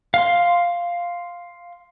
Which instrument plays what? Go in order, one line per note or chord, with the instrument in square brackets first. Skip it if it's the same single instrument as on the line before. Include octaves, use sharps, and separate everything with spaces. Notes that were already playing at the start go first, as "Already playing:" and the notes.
[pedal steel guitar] F5 C6